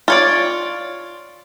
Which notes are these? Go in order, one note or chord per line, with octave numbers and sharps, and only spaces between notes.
F4 C#5 D5